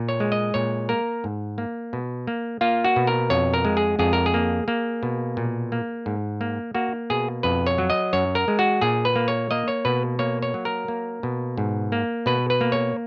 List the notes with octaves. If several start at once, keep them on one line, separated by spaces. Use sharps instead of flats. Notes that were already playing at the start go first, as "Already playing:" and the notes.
Already playing: A#2
C#5
G#3
D#5
A#2 C#5
A#3 A#4
G#2
A#3
B2
A#3
A#3 F4
F#4
B2
A#4
F2 C#5
A#4
G#3
G#4
F2 G#4
A#4
G#4
A#3
A#3
B2
A#2
A#3
G#2
A#3
A#3 F#4
B2 G#4
F2 B4
C#5
F#3
D#5
F#2 C#5
A#4
G#3
F#4
A#2 G#4
B4
A#3
C#5
A#3 D#5
C#5
B2 B4
A#3 C#5
C#5
F#3
A#4
A#3
B2
G#2
A#3
B2 B4
B4
A#3
C#5